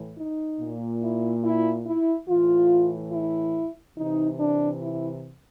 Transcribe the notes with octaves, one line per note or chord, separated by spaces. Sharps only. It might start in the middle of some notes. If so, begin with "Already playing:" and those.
Already playing: A2 E3
D#4
A#2
E4
E4
E4
A2 E3 F4
E4
C3 E3 D#4
D4
E4